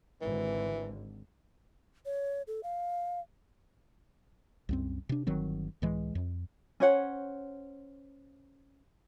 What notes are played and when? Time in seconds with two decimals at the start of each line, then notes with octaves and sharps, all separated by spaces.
0.22 G#1 D3 E3
2.06 C#5
2.47 A4
2.63 F5
4.69 C2 F#2 C4
5.09 C3 D4
5.27 G1 D#3 F#3 C4
5.82 C#2 A2 E3 G#3
6.15 F2
6.80 C#4 C5 C#5 F#5